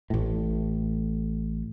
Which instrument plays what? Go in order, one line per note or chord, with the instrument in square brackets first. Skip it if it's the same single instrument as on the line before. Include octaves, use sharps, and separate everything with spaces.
[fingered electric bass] A1 A2